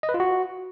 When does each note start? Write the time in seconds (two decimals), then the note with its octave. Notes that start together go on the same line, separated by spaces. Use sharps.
0.03 D#5
0.09 B4
0.14 F4
0.20 F#4